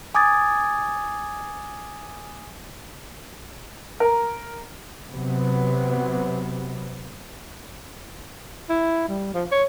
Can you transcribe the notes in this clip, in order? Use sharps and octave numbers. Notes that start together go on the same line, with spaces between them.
G#5 D6 D#6 G#6 A6
A#4
C3 F#3 B3
E4
G3
F3
C#5